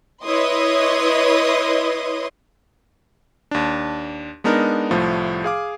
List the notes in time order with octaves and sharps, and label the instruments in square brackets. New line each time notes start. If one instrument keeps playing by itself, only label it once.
[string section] E4 B4 C#5 D#5 C6 D#6
[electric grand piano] D#2 D4
G#3 B3 D4 D#4 A#4
C2 A2 F3 A3
G#4 F5 D6